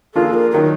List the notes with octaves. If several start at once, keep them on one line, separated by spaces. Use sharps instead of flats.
F3 A#3 D4 F4 G#4 A4
A#4
D#3 F#3 A#4